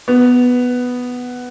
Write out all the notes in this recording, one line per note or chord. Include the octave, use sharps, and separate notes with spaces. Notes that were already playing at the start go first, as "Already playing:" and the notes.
B3